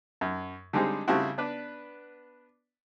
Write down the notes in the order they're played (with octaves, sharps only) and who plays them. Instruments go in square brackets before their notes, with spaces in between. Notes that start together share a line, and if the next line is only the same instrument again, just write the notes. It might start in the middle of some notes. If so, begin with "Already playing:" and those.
[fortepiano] F#2
D3 G3 G#3 C4 D#4 G#4
C#3 G3 A3 C4 E4 F#4
B3 D4 B4